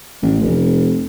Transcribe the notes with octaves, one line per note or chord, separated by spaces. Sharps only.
A1
F1